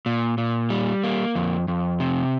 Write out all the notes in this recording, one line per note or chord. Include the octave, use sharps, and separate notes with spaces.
A#2
A#2
G3
A#3
F2
F2
C3